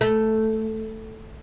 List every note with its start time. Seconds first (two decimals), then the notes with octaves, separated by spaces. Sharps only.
0.01 A3